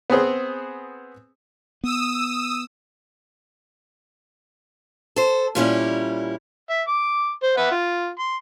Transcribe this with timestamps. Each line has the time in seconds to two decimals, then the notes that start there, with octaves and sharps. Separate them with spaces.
0.10 B3 C4 G#4 C5
1.84 B3 D#6 E6
5.16 A4 C5
5.55 A#2 G3 C#4 E4
6.70 E5
6.88 D6
7.43 C5
7.57 B4 E5 F#5
7.71 F4
8.19 C6